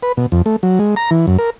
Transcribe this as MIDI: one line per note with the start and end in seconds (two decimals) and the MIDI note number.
0.03 0.12 71
0.17 0.26 47
0.32 0.42 41
0.46 0.56 57
0.63 0.79 54
0.79 0.95 56
0.96 1.10 82
1.11 1.26 52
1.27 1.37 42
1.38 1.50 70